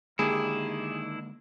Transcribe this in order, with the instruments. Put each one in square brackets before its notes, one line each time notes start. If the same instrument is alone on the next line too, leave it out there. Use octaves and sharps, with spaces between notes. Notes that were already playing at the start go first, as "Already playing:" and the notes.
[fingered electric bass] D3 G#3 A#3 [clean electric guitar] D#3 D4 E4 [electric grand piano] G4 G#4